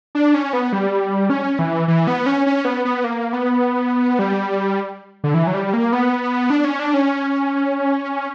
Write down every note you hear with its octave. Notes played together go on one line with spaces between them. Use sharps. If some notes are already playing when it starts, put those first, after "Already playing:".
D4
C#4
B3
G3
C#4
E3
E3
B3
C#4
C#4
B3
B3
A#3
B3
G3
D3
E3
F#3
G3
A#3
B3
D4
C#4
D4
C#4